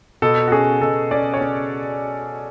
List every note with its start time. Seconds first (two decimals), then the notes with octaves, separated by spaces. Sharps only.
0.22 B2 A4
0.48 F#4
0.52 C#4 G#4
0.81 B2 A4
1.11 C#4 D5
1.34 C#5
1.41 C#4